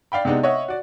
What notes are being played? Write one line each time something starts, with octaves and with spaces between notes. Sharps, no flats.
D5 F5 G5 B5
C3 G#3 B3 D4 D#4
C#5 D#5 E5 F#5
F#4 D5